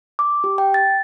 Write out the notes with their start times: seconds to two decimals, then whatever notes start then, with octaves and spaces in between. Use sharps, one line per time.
0.19 D6
0.44 G4
0.58 G5
0.74 A6